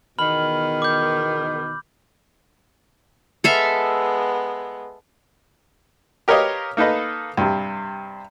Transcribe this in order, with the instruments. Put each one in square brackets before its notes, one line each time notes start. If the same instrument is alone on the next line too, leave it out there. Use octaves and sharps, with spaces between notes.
[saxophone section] E2 B2 D#3 [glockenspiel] B5 F6 F#7
[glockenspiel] D6 G6
[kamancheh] G#3 B3 [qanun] A4 E5 F5
[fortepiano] G4 A#4 B4 C#5 D#5 F5
A#3 D#4 A4 B4 D#5
G2 C3